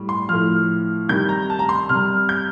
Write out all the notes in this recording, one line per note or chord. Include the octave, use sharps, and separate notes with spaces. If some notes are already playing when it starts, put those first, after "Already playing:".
Already playing: A2 G3
C6
A2 F3 F6
C3 D#3 G3 G6
A#5
A5
A#5
C6
C3 G3 F6
G6